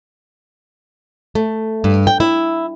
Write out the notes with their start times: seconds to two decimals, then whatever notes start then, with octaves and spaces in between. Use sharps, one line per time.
1.35 A3
1.84 G2
2.07 G5
2.20 E4